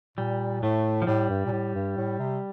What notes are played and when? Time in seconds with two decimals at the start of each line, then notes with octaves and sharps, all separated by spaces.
0.18 A#2 G3
0.63 A2 A3
1.02 F3
1.07 A2 G3
1.30 G2
1.46 A#2
1.52 A2
1.75 G2
1.97 A2
2.19 C3